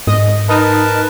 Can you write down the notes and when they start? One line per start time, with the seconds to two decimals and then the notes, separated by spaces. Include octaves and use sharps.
0.07 G#2 D#5
0.49 D#4 A#4 B4 A5